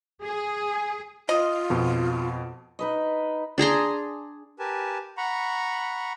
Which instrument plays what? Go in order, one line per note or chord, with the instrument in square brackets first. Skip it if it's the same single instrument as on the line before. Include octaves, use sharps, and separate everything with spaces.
[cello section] G#4
[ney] F4 [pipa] D#5
[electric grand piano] F2 B2
[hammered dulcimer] D#4 B4 D#5
[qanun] D4 G#4 A#5 C6
[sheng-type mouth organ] G4 A#4 B4 G#5 A5
F#5 A#5 B5 C#6